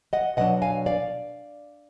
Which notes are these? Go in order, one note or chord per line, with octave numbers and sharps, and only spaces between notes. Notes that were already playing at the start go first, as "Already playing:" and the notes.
D#5 F#5
B2 F#3 D4 D#5 F#5
F5 G#5
D5 F5